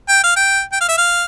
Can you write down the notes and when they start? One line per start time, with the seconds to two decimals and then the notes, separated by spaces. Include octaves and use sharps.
0.09 G5
0.23 F5
0.36 G5
0.72 G5
0.81 F5
0.89 E5
0.98 F5